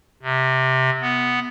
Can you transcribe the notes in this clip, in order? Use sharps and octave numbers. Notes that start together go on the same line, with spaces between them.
C3
B3